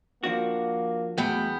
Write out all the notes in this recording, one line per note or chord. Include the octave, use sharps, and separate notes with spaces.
F3 A#3 D4 F#4
E2 F#3 A3 B3 G5